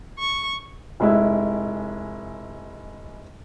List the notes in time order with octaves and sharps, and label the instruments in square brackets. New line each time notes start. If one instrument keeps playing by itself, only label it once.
[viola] C#6
[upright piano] F1 G#3 E4